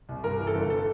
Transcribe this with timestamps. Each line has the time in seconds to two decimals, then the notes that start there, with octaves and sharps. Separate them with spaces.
0.09 C2
0.24 G2 A#4
0.40 E3
0.47 A4
0.55 G1
0.70 A4